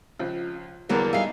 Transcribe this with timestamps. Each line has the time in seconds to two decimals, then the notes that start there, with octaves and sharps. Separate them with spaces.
0.19 C#2 F3
0.89 E2 D3 F#3 G3 A#3 B3 A#4
1.13 G3 D#4 G#4 E5 F5